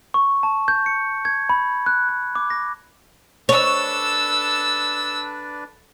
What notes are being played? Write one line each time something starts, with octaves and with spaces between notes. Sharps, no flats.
C#6
A5
G6
C#7
G#6
B5
F#6
F#6
D6
A#6
D4 A4 B4 C#5 D5 E6